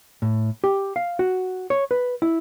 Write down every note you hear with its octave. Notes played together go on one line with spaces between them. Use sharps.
A2
G4
F5
F#4
C#5
B4
E4